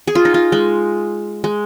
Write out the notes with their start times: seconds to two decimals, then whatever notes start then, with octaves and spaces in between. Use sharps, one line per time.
0.07 G#4
0.15 F4
0.25 D#4
0.34 F4
0.52 G#3
1.44 G#3